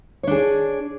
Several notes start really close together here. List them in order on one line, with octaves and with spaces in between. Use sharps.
C#5 D4 G#4